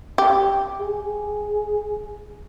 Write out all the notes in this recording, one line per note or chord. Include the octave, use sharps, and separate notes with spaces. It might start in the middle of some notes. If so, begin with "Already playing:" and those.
G4
G#4